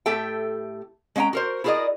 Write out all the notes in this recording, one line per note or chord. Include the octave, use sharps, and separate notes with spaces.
A2 A3 G4 A4 E5 G5
G#3 C#4 F#5 G5 A#5
F#4 A#4 C5
E4 F#4 G#4 A#4 D5 D#5